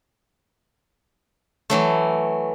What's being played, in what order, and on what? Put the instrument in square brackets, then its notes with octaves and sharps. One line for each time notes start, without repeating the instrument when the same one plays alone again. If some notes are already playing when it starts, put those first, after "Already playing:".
[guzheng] E3 F#3 A3